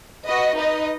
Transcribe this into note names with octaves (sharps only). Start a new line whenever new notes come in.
F#4 B4 D#5
D#4 B4 D#5